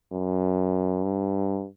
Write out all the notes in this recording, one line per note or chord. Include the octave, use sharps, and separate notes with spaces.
F#2
G2